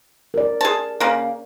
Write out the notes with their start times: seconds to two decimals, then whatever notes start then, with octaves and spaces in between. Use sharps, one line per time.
0.34 A#4 D5
0.61 G#4 A5
1.00 C#3 A#3